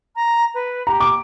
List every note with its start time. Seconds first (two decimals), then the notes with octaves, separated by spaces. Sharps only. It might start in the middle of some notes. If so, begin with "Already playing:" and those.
0.15 A#5
0.54 B4
0.87 G4 A#5
1.00 D6